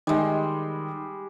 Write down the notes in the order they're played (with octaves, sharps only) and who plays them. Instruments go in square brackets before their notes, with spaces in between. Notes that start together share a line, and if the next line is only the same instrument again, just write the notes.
[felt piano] D#3 [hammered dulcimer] G3 G#3